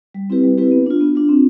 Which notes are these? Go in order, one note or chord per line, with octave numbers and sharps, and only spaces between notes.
G3
C4 E4 G4 B4
G3
C4 E4 G4 B4
B3
D4 F4
B3
D4 F4
C4